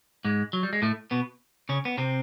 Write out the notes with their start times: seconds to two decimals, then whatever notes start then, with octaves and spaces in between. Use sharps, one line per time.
0.25 G#2 G#3
0.53 F#3
0.63 G3
0.73 G#3
0.82 A2 A3
1.11 B2 B3
1.69 C#3 C#4
1.85 B3
1.98 C3 C4